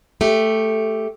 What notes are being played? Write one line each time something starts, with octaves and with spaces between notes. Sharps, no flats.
A3 G4